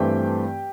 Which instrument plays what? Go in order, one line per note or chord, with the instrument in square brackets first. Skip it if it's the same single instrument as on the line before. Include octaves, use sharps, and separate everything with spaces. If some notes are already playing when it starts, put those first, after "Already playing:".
Already playing: [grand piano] G2 E3 A3 C4 G4 G5